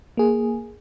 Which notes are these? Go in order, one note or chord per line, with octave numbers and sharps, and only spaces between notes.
A#3 G#4